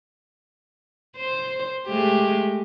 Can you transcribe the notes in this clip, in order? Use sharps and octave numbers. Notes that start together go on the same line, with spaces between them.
C5
G#3 A3 G4